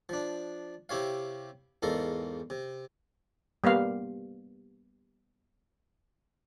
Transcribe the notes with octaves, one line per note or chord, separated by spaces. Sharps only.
F3 D4
C3 E4 G4 C#5 F5
E2 G#2 A4 A#4 F5
C3
G3 A#3 B3 F5